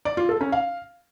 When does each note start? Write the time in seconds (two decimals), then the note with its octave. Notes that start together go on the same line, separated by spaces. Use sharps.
0.05 D5
0.17 F4
0.29 A4
0.41 C#4
0.52 F5